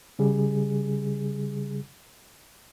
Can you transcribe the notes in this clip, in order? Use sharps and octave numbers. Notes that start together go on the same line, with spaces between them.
C#3 G3 G#4